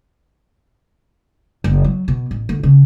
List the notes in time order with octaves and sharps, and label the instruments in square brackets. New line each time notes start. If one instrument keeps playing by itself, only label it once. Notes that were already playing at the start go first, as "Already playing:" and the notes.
[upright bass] F#1
F#3
B2
A1
D2
C#3